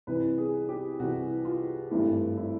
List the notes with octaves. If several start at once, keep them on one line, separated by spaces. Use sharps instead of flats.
C2 C3 E3 B4
G#4
G4
C2 C3 E3 F#4
F4
G#1 G2 E3 A3 E4
E4